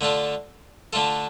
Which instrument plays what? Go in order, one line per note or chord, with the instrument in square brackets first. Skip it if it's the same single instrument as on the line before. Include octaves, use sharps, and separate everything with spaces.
[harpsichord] D3 A3 D4 F4 A4
D3 A3 D4 F4 A4